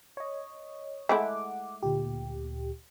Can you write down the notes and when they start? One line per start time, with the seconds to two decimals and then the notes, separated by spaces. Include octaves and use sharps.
0.17 C#5 D#5
1.09 G#3 A3 E4 F#5 D6
1.83 D2 A#2 G4